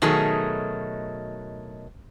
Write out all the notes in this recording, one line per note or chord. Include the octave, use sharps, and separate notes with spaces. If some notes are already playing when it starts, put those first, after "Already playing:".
B2 D#3 F#3 A3 D#4 G#4